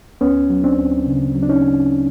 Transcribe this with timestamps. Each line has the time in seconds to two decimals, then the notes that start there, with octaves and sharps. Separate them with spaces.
0.21 D2 B3 C#4
0.50 F#3
0.64 C4 D4
0.78 D2
1.07 C#3
1.35 F#3
1.43 D4
1.49 C#4 D#4
1.64 C#3